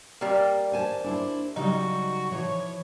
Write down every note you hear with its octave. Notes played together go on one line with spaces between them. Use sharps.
G3 A#3
C5 G#5 A5
D4 E4 C5
C#3 F#3 G3 D#4 F#4
E3 F3 C#5